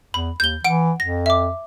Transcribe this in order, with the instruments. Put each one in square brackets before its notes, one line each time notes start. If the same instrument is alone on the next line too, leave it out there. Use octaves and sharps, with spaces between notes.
[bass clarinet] E2 [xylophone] B5
[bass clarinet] D#2 [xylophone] G6 G7
[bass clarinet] E3 [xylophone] F#5 D7
[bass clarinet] F2 [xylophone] A#6
[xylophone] E5 D6